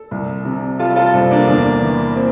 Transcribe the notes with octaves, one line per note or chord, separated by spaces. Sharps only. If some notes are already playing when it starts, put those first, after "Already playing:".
Already playing: A4
C2
C3
G3 F4 A4
F4 A4
C2 C4
A#3 D4
E2 A#3 D4
E3
A#3 C4